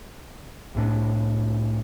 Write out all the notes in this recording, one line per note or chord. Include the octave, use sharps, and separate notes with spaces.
C2 A2 D4